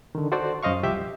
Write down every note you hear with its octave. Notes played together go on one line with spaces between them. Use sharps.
D3 D#3
F#4 A4 C5 D5
F#2 C5 D#5 F5 C#6
C2 F3 G4 E5 D6 G6